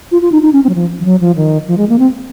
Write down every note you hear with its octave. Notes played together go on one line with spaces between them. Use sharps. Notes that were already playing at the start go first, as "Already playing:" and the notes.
F4
F4
D#4
D#4
C#4
C4
F#3
F3
F3
F#3
F3
D#3
F3
G#3
A#3
C4